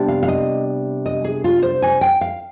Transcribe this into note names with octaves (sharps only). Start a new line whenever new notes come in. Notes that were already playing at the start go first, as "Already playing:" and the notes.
Already playing: C3 G3 B3 D4
F5
F5
D#5
D#5
G#4
F4
C5
G#5
G5
F5